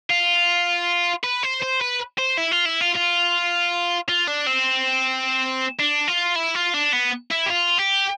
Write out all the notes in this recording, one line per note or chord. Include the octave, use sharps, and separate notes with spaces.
F4
B4
C5
C5
B4
C5
E4
F4
E4
F4
F4
F4
D4
C4
D4
F4
E4
F4
D4
B3
E4
G4
F4
G4